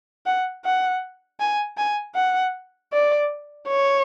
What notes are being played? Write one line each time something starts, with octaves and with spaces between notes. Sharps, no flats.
F#5
F#5
G#5
G#5
F#5
D5
C#5